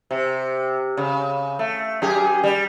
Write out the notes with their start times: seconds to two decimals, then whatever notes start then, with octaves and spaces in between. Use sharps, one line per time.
0.11 C3
0.97 C#3
1.59 A3
2.02 F#2 G4 G#4
2.44 G3